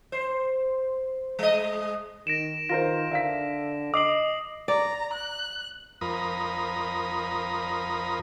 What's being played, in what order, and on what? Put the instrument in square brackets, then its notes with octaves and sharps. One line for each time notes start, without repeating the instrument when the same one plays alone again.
[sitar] C5
G#3 D#5
[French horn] D#3 [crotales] A#6 D7 E7
[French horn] D#3 [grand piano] F4 A#4 C5 [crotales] A#6
[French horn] D3 [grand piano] E5 F5 B6
[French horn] D#5 [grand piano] D6 [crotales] D#6 C7 F#7
[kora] D5 [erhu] A#5
[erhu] F#6
[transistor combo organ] F2 A#4 B5 D#6